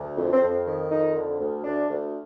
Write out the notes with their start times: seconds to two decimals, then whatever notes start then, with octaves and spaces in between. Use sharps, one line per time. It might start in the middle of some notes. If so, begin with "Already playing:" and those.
Already playing: D2
0.17 F2
0.33 C4
0.41 F2
0.50 C4
0.66 D#3
0.91 F2 D#4
1.16 D3
1.39 D2
1.64 D2 D4
1.89 D2